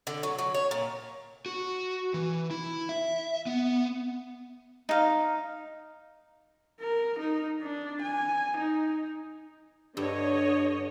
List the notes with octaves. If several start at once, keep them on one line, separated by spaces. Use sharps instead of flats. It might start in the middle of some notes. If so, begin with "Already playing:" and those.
D3
F#3
F#3
C#5
A#2
F#4
E3
E4
E5
B3
D#4 F5
A#4
D#4
D4
G#5
D#4
G2 D3 C#5 D#5